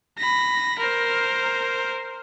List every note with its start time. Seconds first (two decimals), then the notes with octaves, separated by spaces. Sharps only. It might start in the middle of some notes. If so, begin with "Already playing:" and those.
0.18 B5 A#6
0.79 A#4 C5